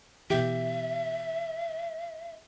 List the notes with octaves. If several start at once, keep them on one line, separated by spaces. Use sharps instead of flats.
B2 E3 G4 E5